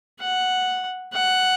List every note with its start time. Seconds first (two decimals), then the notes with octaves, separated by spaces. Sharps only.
0.20 F#5
1.13 F#5